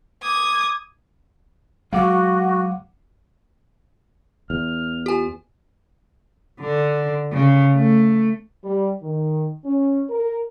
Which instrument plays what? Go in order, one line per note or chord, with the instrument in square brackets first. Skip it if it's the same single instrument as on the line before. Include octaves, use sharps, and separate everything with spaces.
[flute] D6 [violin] D#6 G#6
[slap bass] F#3 G#3 [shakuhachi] F#4 [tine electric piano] F5 F#5 D6
[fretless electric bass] E2 [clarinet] F6
[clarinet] F4 [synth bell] G4 G#5
[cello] D3
C#3
A3
[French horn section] G3
D#3
C#4
A#4